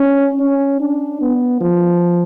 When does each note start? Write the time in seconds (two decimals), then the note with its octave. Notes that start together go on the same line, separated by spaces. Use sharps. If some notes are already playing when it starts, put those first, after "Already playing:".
Already playing: C#4
0.40 C#4
0.80 D4
1.21 B3
1.61 F3